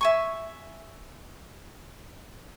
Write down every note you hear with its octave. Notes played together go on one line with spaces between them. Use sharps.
E5 G#5 C#6